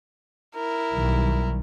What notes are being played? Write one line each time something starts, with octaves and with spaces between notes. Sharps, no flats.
E4 A#4
B1 D#3 G3